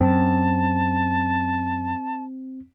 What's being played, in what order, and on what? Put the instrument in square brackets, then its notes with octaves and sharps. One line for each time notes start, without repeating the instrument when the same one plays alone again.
[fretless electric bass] F#2 [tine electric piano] C4 [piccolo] A5